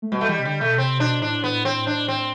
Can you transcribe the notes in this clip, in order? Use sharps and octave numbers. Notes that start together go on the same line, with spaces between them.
A3
B2 G3
A3
E3 G3
C3
D3 G3
B2 A3
C3 C4
B2 D4
A2 D4
B3
C4
D4
C4